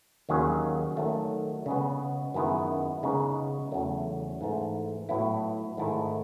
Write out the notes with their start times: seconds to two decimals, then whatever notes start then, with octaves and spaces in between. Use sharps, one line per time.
0.29 D#2 D#3 F#3 C#4 G#4
0.97 D#3 F#3 A3
1.66 C#3 G#3 B3
2.34 F#2 D#3 G#3 B3 E4
3.03 C#3 G#3 B3 D#4
3.71 E2 C#3 F#3 A3
4.41 G#2 E3 A3
5.09 A2 F#3 B3 E4
5.77 G#2 D#3 A3 E4